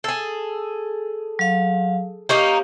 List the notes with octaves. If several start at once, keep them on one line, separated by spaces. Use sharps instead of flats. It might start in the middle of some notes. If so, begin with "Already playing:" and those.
G#4 A4
F#3 F5
A#3 C#4 D#4 G4